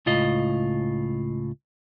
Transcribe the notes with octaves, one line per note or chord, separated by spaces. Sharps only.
C#2 A2 F4 D#5